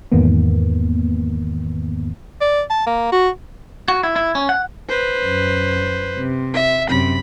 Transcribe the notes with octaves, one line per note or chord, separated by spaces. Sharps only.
E2 G#2 D#3 A#3 B3
D5
A5
A#3
F#4
F#4
E4
E4
C#4
F#5
B4 C5
F#2
C3
E5
F#2 C3 B5